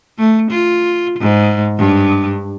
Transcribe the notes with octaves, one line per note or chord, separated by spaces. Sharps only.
A3
F4
G#2
G2